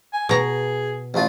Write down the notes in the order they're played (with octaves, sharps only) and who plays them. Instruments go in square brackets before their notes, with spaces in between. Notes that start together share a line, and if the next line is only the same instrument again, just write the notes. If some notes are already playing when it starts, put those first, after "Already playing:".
[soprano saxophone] G#5
[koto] B2 A#5 [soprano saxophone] G#4
[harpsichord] A1 F4 [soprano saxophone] A3